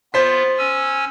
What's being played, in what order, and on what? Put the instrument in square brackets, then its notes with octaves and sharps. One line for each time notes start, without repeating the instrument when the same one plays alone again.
[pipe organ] B3 F4 [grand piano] C5 B6
[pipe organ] C#4 G#5 E6